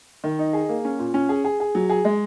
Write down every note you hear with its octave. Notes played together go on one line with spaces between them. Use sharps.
D#3
D#4
G#4
A#3
C#4
A#2
C#4
G#4
G#4
G#4
F#3
G#4
G#3